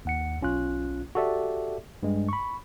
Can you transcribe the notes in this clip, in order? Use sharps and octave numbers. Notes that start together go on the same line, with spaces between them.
D#2 F#5 C#7
B1 C#4 F4 F#6
F#4 G4 A4 D5 E5
G2 G#3
B5 C#6